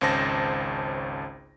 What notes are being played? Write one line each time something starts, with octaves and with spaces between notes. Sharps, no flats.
G#1 C#2 C#4 C5 A5 A#6